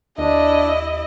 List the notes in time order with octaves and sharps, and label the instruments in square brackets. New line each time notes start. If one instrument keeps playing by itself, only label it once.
[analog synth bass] D#2 [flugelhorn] D4 [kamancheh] E4 D#5